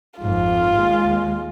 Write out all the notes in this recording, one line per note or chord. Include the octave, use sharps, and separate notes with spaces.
G#1 F2 G#2 F4
D#2 G#3